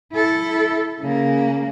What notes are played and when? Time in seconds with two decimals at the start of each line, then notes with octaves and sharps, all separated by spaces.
0.13 E4 A4
1.01 C#3 A#3